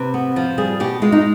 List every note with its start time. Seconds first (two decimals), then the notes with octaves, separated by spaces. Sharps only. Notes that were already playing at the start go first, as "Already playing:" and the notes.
Already playing: C3 B4
0.14 B3
0.36 F3
0.58 G3 G#4
0.80 B2 G4
1.02 G#3 F4
1.12 D#4